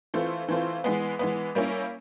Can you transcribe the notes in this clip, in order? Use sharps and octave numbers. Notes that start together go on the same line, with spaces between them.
E3 A3 C4 F4
E3 A3 C4 F4
E3 G#3 B3
E3 G#3 B3
G3 A#3 C#4 E4